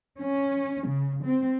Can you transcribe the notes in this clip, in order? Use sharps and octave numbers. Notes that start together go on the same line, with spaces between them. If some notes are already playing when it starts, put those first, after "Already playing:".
C#4
C#3
C4